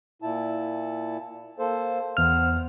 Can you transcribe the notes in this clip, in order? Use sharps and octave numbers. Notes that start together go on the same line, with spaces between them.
A#2 E4 A5
A#3 A4 C5
E2 B3 C5 F6